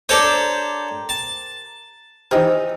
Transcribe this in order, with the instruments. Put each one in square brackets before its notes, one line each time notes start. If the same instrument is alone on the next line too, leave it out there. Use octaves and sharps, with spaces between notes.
[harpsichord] D4 A4 C#5 [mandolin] G4 A#4 C5
[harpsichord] A5
[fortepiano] E3 D#4 G4 [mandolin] F4 E6 [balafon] C5